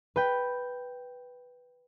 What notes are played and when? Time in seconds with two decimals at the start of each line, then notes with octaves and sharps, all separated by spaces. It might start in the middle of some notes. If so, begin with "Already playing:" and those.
0.16 B4 G5